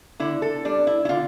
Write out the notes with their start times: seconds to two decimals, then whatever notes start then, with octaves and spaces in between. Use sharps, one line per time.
0.20 D3 E4
0.42 A4
0.65 G3 D4
0.87 E4
1.05 E4
1.09 D3 F4